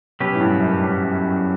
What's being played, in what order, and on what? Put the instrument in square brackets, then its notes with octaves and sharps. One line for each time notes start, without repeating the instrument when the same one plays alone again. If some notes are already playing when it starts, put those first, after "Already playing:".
[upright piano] B2 [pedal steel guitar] F#3 C#4 G4 B4
[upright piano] A2
G2
F#2
G2